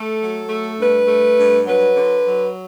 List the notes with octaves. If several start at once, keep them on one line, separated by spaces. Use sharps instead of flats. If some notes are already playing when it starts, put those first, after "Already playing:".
Already playing: A3 A4
F#3
A3
G2 B4
A3
G2
F#3 B4
D3
F#3